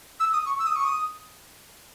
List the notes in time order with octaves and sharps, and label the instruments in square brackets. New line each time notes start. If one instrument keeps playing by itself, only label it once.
[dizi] E6
D#6
C#6
E6
D#6
C#6
D#6